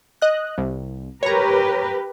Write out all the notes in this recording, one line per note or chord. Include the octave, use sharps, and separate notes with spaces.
D#5 F#6
C2
G4 A#4 B4 C#5 A#5